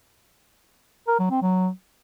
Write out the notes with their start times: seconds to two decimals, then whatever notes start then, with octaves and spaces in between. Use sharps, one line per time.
1.08 A#4
1.19 F#3
1.31 C4
1.42 F#3